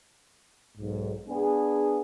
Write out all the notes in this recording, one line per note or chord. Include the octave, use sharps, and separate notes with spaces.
B1 G#2
B3 D4 G#4